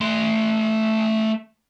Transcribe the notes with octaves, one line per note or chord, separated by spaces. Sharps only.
A3 C6